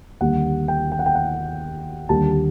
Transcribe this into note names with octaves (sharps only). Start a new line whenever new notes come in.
D#2 D3 G3 A#3 F#5
G5
G5
F#5
G5
F#5
D#2 D3 G3 A#3 A5